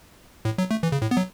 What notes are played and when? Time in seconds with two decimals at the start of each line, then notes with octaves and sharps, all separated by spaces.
0.45 A2
0.58 F#3
0.71 A3
0.83 E3
0.92 C#3
1.02 A2
1.11 B3
1.17 F#3